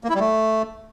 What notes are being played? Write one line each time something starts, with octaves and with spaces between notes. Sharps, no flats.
A#3
E4
G3
A3